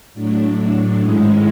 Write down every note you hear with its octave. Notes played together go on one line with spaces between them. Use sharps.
A2 F#3 A3 D4
G#2 D#3 G#3 C#4 E4